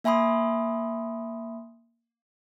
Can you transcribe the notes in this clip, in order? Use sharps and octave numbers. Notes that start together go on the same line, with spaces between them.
A#3 E5 G#5 B5 C6 D#6